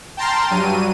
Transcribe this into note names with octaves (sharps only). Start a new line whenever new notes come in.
G5 A5 A#5 C6 F6
G2 F#3 D#7